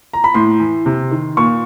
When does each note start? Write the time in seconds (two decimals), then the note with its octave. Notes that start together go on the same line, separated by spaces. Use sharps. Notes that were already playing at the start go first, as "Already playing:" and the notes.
0.13 A#5
0.24 B5
0.34 A2 C6
0.60 E3
0.86 C3
1.11 D#3
1.37 A#2 C#6